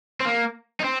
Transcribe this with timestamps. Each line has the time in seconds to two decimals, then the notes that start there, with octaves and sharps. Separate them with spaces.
0.21 C4
0.25 A#3
0.80 D#4
0.84 C4